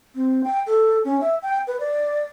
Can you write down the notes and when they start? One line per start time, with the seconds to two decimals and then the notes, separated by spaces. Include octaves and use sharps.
0.15 C4
0.44 G5
0.67 A4
1.05 C#4
1.21 E5
1.42 G5
1.67 B4
1.80 D5